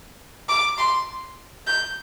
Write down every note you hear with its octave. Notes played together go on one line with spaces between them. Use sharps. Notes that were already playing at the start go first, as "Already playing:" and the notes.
D6
C6
G6